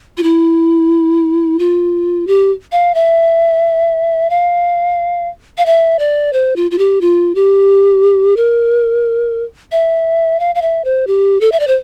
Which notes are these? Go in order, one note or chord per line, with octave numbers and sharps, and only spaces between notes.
F4
E4
F4
G4
F5
E5
F5
F5
E5
D5
C5
F4
F4
G4
F4
G4
A#4
E5
F5
F5
E5
C5
G4
A4
E5
D5
C5